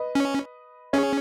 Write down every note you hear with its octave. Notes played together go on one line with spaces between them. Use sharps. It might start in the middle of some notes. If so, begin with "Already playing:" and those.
Already playing: B4 D#5
C#4
C#4 G#4 C#5